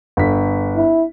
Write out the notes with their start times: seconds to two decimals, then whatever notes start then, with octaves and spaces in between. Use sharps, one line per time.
0.17 G1 B6
0.76 E4